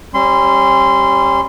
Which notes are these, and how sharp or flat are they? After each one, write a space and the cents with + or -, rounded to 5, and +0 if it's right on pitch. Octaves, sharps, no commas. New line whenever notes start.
G3 -5 C#4 -40 C6 -20